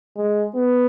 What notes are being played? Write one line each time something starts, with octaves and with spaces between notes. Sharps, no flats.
G#3
B3